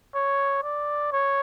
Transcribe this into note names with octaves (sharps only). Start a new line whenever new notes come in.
C#5
D5
C#5